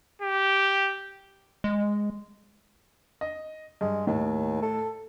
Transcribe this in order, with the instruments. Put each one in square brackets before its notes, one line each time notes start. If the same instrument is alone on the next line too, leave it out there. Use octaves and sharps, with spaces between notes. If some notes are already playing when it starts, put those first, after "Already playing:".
[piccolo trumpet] G4
[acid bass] G#3
[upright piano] D#5
[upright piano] G2 [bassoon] G#3
[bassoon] D#2 [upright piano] A2
[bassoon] A4